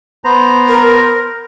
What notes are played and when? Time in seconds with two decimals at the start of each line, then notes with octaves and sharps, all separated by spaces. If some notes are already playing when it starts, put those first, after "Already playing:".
0.24 B3 C5 A#5
0.68 A#4